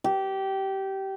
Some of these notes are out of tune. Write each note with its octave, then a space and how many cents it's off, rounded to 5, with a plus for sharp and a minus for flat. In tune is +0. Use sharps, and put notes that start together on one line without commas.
G4 -20